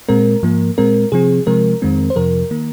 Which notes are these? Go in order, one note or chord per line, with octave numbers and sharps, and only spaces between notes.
A#2 G#3 C4 A#4
G#2 F3 A#3
A#2 G#3 C4 A#4
C3 F3 C4 G#4
C3 F3 G#3 C4 A#4
F2 D#3 G#3 C4
C5
F2 C3 F3 A#4
D#3 A#3